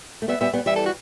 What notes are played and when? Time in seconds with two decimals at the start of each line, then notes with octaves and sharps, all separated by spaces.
0.22 A3
0.28 G3 B3 E5
0.41 G3 B3 E5
0.53 G3 B3
0.66 E3 G3 E5
0.76 A4
0.86 F#4